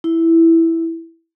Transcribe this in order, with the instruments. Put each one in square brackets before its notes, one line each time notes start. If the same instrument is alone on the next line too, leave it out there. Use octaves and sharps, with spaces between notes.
[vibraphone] E4